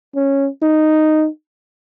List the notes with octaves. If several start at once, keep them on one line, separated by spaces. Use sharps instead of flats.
C#4
D#4